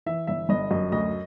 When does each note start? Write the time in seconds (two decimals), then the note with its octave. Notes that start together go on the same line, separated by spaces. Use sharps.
0.06 E3 E5
0.27 G1 E5
0.49 G1 D#5
0.71 F#2 D#5
0.92 D2 D#5